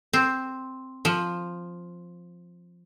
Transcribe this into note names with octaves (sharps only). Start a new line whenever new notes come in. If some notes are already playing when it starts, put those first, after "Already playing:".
C4
F3